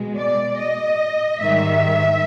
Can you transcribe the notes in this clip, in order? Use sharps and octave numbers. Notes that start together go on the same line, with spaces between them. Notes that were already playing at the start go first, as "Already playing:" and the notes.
Already playing: B2 G#3
D5
D#5
G#2 D#3 G3 E5